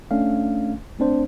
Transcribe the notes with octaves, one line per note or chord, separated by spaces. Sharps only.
A3 C#4 D4 F5
A3 C4 D4 C5